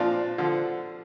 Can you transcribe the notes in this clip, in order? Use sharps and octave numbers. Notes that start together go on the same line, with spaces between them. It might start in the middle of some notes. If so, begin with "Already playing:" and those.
Already playing: A#2 F3 D4 F4
D3 F3